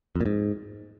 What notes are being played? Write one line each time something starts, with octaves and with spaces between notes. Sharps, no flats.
F2
A#2
G#2